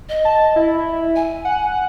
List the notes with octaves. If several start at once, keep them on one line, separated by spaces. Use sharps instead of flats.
D#5
A5
E4
G#5
F#5